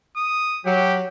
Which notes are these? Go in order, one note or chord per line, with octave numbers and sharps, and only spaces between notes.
D#6
F#3 G4